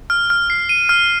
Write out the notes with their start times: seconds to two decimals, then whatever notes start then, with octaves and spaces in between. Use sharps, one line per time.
0.10 F6
0.30 F6
0.50 C7
0.69 D#7
0.89 F6